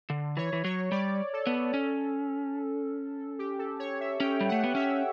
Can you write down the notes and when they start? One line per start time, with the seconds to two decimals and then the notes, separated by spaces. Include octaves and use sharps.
0.10 D3
0.37 E3 C#5
0.53 E3
0.64 F#3 C#5
0.91 G3 D5
1.33 A4
1.47 B3
1.74 C#4
3.39 G4
3.59 A4
3.79 C#5
4.00 E5
4.20 C#4 G5
4.40 G3
4.48 A3 F#5
4.64 B3
4.75 C#4 E5